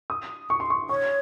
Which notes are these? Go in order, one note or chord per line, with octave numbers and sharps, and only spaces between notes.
D#6
C#6
C6
C#6
C#5 C#6